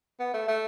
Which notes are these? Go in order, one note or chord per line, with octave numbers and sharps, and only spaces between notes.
B3
A3
A3